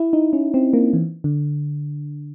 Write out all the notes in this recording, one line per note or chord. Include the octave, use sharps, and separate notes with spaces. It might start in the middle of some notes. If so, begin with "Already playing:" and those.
Already playing: E4
D#4
C#4
C4
A#3
E3
D3